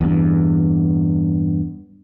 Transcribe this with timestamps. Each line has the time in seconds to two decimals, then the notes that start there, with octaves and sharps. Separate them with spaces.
0.01 E2 G2